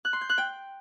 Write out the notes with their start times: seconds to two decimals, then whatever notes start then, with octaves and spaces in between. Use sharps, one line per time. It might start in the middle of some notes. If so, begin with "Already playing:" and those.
0.05 F#6
0.13 C6
0.21 G6
0.29 F#6
0.38 G5